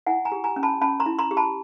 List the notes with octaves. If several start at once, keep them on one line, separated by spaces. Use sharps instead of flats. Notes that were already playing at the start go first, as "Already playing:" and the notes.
E4 F#5 G#5
G#5 A#5
G4
G#5 A#5
C#4
A5 B5
C#4 A5 B5
A#5 C6
E4
A#5 C6
G4
A5 B5